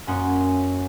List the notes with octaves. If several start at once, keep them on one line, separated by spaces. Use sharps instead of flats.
F#2 A#3 C#4 F#5 C6 D#6